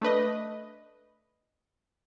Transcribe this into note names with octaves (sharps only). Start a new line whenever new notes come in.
A3 D4 B4 D#5